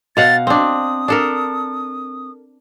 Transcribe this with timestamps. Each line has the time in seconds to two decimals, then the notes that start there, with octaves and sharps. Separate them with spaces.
0.17 B2 F5 F#5 A6
0.47 C4 D4 D#6
1.08 D4 A4 A#4